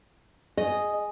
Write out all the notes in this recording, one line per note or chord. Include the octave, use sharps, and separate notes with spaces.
G#4 D#5